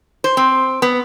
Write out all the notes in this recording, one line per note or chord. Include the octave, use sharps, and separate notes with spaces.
C5
C4
B3